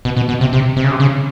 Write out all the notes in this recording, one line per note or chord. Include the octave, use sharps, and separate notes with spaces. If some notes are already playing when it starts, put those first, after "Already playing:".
B2
B2
B2
C3
C3
C3
C#3
C3
C#3